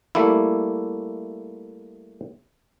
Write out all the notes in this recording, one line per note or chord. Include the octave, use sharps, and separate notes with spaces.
G3 A3 A#3 E4